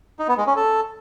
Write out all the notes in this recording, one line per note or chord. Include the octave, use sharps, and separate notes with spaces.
D#4
B3
G#3
C#4
A4